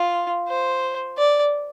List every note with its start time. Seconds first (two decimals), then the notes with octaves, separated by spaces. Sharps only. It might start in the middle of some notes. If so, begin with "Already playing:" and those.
Already playing: F4
0.48 C5
1.17 D5